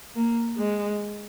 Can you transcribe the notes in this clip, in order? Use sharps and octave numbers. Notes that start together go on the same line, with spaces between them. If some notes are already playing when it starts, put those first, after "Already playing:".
A#3
G#3